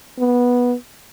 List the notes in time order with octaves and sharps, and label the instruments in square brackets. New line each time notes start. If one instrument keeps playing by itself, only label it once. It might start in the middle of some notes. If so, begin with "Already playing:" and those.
[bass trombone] B3